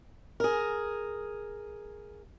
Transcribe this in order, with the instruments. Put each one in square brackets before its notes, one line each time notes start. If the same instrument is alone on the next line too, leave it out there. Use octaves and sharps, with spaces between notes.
[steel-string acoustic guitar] G#4 A#4